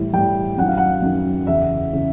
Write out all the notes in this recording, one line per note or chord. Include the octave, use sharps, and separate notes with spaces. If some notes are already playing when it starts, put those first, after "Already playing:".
Already playing: A2 E3 G3
A2 E3 G3 G5
F#2 D#3 F#3 F#5
F5
F#5
F#2 D#3 F#3
E2 C#3 E3 E5
C#3 E3